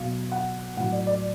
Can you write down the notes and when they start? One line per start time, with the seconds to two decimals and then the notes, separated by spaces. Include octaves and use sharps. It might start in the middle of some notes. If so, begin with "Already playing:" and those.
Already playing: B2 F#3 F5
0.32 F#5
0.77 A2 F#3 F#5
0.92 D5
1.07 D5